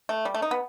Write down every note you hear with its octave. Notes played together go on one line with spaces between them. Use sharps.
A3
G3
A3
D#4
B3